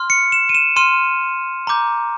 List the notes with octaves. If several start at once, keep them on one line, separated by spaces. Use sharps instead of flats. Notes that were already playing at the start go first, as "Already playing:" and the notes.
Already playing: C6 F6
C#7
E7
D#7
E7
C6 F6 D#7
A#5 D6 G6